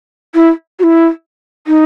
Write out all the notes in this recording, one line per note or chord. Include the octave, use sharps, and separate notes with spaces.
E4
F#4
E4
D#4